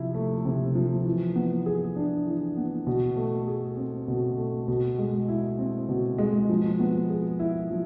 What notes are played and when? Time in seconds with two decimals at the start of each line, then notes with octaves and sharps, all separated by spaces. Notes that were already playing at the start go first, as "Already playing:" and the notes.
Already playing: C3 F3 E4
0.14 A3
0.45 C3
0.75 F3
1.06 E3
1.36 B3
1.66 G#4
1.96 D4
2.26 E3
2.57 B3
2.87 B2
3.17 A3
3.47 G#4
3.77 C4
4.08 B2
4.37 A3
4.68 B2
4.98 G#3
5.28 E4
5.59 C4
5.89 B2
6.18 G#3
6.49 F3
6.80 B3
7.10 G#4
7.39 E4
7.70 F3